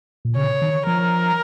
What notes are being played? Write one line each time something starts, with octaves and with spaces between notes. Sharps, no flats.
A#2
C#3 C#5
D#3
F3 A#4